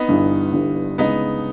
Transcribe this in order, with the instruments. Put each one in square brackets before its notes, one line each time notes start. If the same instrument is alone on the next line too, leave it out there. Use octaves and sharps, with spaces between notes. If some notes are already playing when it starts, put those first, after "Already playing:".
Already playing: [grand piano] B3 D#4
[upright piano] G1 G2 E3 G3
G1 G2 E3 G3
[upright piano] C#2 C#3 E3 G#3 [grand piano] B3 D#4